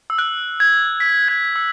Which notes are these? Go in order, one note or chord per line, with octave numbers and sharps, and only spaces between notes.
E6
F#6
G#6
B6
G#6
E6